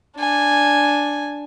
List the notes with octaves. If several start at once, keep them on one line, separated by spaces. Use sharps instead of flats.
D4 G#5